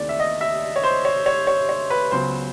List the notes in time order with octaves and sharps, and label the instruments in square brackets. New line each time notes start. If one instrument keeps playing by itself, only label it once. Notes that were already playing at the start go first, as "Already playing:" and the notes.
Already playing: [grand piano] D#2 C#3 E3 A3 C4 D5
E5
D#5
E5
C#5
C5
C#5
C#5
C#5
C#5
B4
C#2 C#3 F#3 B3 C5